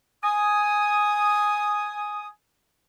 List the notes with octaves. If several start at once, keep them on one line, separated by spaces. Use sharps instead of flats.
G#5 D#6